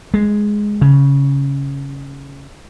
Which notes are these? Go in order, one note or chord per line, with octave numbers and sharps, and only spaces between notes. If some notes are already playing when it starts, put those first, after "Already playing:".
G#3
C#3